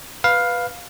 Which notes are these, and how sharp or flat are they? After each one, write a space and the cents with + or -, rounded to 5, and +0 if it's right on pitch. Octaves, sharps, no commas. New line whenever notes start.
B4 +0 F5 +10